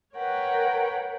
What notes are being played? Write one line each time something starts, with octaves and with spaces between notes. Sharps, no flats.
A#4 B4 C#5 F#5 G5